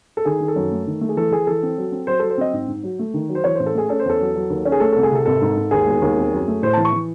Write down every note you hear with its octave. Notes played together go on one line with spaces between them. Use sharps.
A4
D#3 G#4
D#3
A4
F#2
A3
D#3
A3
G#4
E3 A4
E3 G#4
E3 A4
C4
F#3
C4
F#3 C5
F#3 A4
C5
C4 D#5
G#2
G#2
F#3
A3
D#3
F#3
C5
E3 C#5
A1 C5
A4
A3 G#4
C#4 A4
C5
E2 A4
F#3
F#3
D#2
C#4
G#4
A3 A4
C2 A4
G#4
C3 A4
G#1 A4
G#2
G#2
D#2 G#4
E1
D#2
C4
F#2
A3
A2 C5
E3 A5
C#6
E3